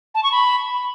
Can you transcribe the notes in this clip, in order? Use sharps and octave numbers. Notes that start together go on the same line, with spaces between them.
A5
C#6
B5